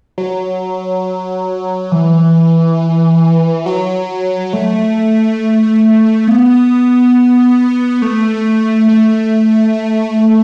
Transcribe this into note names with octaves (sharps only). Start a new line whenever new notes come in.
F#3
E3
F#3
A3
B3
A3
A3